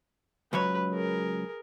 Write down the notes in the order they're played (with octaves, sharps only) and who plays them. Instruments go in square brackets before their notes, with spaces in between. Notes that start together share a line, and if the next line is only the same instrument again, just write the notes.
[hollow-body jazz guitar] C#2 F#3 C#5 [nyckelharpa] B4
[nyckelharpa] G#4 A#4